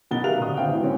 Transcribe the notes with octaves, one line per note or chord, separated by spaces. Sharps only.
B1 D#3 B3 D#4 A6 G7
G4 A#4 E5 F5 F#6 F7
D#1 D3 D#6
G1 C4 F#4 F5 G5
E2 A2
G#2 C4 C#4